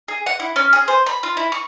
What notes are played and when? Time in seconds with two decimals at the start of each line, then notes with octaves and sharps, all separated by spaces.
0.08 G#4
0.26 F#5
0.40 E4
0.56 C#4
0.73 G#4
0.88 C5
1.07 B5
1.23 F4
1.37 E4
1.52 C#6